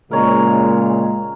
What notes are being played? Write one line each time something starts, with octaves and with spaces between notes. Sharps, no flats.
A#2 C#3 G#3 A#4 C#5 A#5